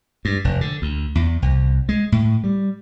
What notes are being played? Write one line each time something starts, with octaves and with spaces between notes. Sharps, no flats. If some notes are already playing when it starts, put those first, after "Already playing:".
G2
F1
D3
D2
E2
C2
G#3
A2
G3